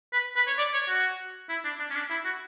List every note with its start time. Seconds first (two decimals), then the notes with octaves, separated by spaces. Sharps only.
0.13 B4
0.36 B4
0.47 C#5
0.58 D5
0.73 C#5
0.89 F#4
1.49 E4
1.64 D4
1.79 D4
1.91 C#4
1.95 D4
2.10 E4
2.25 F#4